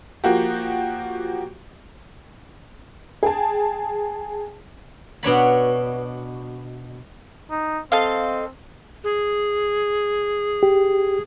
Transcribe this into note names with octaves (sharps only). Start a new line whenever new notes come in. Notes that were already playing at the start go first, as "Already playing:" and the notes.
F3 A#3 F#4 G4
G#4 G5 A5
B2 D4 C#5 B5
D#4
C4 A4 D#5 F5
G#4
G4